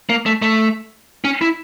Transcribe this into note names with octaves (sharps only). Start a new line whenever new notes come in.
A#3
A3
A3
C#4
E4